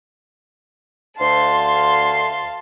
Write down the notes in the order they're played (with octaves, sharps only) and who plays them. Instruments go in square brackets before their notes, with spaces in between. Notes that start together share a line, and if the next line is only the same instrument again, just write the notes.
[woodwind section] D2 C6 [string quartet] F5 A5